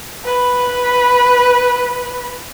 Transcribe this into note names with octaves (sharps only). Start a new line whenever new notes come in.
B4 B5